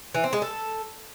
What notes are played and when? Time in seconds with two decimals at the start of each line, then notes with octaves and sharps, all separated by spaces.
0.15 E3
0.24 C4
0.33 G#3
0.42 A4